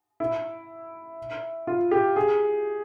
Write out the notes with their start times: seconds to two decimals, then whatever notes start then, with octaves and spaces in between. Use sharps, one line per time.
0.20 E4
1.67 F4
1.91 G4
2.16 G#4